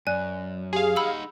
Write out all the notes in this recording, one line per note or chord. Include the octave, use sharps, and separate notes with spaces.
F#2 D5 G#5 F#6
G4 G#4 F5
D#4 F#5 B5 E6